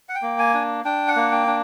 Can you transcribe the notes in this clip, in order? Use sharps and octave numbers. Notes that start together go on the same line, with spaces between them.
F#5
G5
A#3
G#5
D4
D4 G5
F#5
A#3
G5
D4